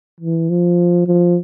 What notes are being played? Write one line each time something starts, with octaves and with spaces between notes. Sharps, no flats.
E3
F3
F3